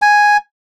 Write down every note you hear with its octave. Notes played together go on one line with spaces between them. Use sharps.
G#5